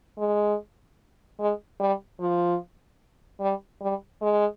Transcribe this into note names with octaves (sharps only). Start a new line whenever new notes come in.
G#3
G#3
G3
F3
G3
G3
G#3